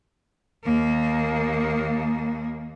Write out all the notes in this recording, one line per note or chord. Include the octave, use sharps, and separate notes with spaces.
D#2 A#3